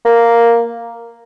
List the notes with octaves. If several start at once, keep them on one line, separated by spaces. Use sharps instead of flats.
A#3